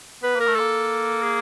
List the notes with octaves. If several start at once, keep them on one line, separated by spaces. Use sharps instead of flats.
B3 B4
A#3 A#4
A3
A#3 A4
G#4